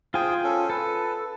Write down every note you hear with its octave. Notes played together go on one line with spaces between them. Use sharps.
F4 G#4 C5 G5 G#5
C#4 A4
A4 B4